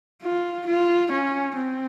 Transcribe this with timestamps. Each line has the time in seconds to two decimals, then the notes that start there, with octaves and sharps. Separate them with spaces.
0.23 F4
0.67 F4
1.11 C#4
1.57 C4